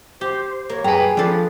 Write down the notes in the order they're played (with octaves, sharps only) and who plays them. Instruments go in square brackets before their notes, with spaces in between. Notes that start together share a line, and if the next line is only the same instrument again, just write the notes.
[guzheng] G4 [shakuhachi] C5
[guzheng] A#3 [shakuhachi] C#5
[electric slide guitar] F#2 B4 [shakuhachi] G#4 [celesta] G5 G#5 [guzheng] A#5
[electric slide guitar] F3 [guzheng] D4 A4 B4